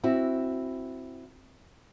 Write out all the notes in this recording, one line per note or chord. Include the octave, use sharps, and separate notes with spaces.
C4 E4 F#4